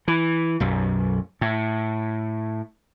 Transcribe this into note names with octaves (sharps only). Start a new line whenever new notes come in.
E3
B1 F#2
A2